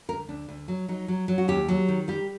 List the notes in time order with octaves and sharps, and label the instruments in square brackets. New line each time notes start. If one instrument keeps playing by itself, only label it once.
[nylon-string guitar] D2 A#4
D2 D4
D2
F#3
F#3 D#4
F#3
F#3
F#4
D#2 G4
F#3
D#3
G3 G4